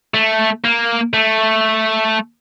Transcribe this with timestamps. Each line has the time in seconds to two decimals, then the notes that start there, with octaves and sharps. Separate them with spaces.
0.14 A3
0.64 A#3
1.13 A3